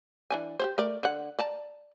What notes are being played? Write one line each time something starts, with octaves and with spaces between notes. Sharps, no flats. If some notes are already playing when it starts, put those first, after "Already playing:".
E3 D4 G#5
G4 G#4 C5
A3 A#4 D5
D3 F#5
D5 A5 A#5